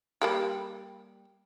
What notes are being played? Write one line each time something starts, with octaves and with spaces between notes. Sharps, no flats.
G3 A#3 G4